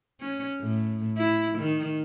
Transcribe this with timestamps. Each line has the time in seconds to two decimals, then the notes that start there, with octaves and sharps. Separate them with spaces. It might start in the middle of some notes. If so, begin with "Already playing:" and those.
0.21 C#4
0.61 A2
1.18 E4
1.59 D#3